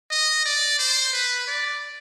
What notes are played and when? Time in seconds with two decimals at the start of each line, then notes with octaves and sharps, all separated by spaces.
0.11 D#5
0.45 D5
0.79 C5
1.13 B4
1.47 D5